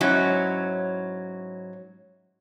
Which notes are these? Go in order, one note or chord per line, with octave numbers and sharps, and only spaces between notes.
G#2 F#3 C#4 E4